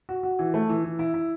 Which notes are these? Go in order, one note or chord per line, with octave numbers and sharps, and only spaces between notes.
F#4
F#4
E3
A3
E3
E3
E4
E4